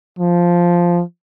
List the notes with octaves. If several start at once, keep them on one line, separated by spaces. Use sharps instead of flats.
F3